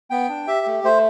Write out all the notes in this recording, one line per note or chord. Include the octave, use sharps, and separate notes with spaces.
B3 G5
D4
G4 E5
A3
A3 C5